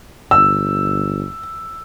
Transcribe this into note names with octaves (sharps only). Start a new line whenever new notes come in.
G1 E6